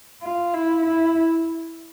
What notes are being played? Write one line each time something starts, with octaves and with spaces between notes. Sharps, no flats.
F4
E4
E4